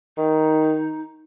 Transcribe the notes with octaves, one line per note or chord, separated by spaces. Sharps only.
D#3 D#4